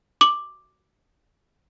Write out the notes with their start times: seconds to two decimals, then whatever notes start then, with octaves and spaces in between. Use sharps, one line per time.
0.21 D6 F#7